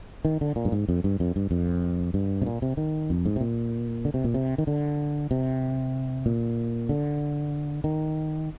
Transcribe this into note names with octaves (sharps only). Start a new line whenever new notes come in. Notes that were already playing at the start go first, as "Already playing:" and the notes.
D#3
D3
A#2
G2
G#2
F2
G2
F2
G2
F2
G2
C3
A#2
C3
D#3
F2
G#2
C3
A#2
D3
C3
A#2
C3
D#3
D3
C3
A#2
D3
D#3